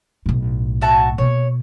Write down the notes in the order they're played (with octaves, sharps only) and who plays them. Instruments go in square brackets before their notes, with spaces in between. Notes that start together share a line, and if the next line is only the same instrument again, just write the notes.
[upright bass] B1 A2
[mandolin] F#4 E5 A5
[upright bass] B2 A#3 [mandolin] C#5